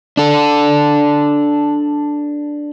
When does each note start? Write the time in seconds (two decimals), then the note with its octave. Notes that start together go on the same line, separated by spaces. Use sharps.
0.17 D4 A4